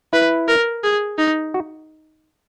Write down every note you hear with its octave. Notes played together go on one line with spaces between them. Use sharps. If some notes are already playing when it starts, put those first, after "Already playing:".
E4 B4
A#4
G#4
D#4
F#4